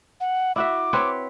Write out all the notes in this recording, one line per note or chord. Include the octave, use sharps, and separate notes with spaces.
F#5
E4 F#4 E5 D6
C4 B4 C#5